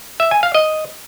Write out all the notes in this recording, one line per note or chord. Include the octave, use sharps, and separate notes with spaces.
E5
G#5
F5
D#5